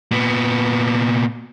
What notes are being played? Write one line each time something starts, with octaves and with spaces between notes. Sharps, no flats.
A#2 B3